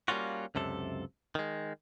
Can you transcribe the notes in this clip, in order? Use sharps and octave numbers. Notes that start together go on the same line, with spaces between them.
G3 A#3 C#4 F4 F#4
C#2 F#2 C3 A4
D#3 G#3